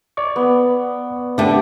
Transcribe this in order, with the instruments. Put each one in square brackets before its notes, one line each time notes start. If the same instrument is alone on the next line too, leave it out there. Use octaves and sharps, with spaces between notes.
[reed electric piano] D5 C#6 D6
[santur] B3
[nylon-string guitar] D3 A3 [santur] G4